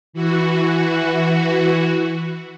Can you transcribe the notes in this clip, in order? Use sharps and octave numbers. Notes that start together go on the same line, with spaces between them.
E3 F#4